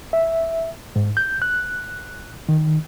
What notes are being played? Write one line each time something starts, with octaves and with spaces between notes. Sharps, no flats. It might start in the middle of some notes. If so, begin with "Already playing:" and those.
E5
G#2
G6
F#6
D#3